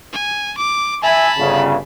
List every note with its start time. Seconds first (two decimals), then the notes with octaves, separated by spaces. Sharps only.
0.13 G#5
0.58 D6
1.03 E5 G#5 A5 B5
1.38 G1 C#3